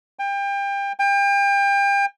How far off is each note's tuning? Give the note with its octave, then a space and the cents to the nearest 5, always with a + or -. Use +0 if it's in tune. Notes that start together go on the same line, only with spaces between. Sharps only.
G5 +30
G5 +35